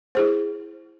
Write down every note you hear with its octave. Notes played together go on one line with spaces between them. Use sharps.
E4 G#4 C5